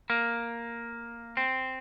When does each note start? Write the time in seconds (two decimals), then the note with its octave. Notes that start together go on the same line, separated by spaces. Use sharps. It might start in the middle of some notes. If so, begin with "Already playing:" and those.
0.10 A#3
1.37 C4